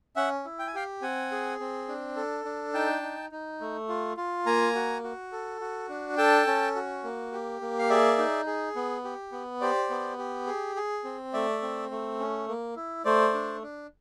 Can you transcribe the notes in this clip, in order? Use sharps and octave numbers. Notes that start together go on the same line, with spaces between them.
C#4 E5 F#5
E4
G5
G#5
G4 F5 G5
C4 F#5 G#5
G#4
C4
D4
A4
D4
D#4 G5 A5
D#4
D#4
A3
F4
F4
A#3 G#5 A#5
F#4
F#4
A4
F#4
D4
A4 G5 A5
C#4
F#4
A#3
G4
A#3
F5
G#4 D5 E5
D#4
G#4
B3
G4
B3
G4 C5 D5
B3
G4
G#4
G#4
C4
A3 D5 E5
C4
A3
C#4
A#3
E4
A3 C5 D5
D4
D4